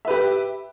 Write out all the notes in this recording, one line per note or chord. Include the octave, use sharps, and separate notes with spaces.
G4 B4 E5